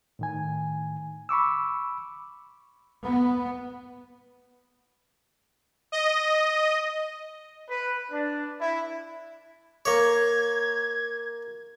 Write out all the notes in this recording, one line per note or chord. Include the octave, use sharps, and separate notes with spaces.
A2 D#3 G#5
B5 C#6 D6 E6
B3
D#5
B4
D4
E4
A#3 C#5 G#6